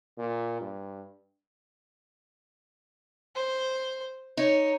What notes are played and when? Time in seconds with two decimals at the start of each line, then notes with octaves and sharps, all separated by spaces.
0.18 A#2
0.61 G2
3.35 C5
4.37 D#4 C#5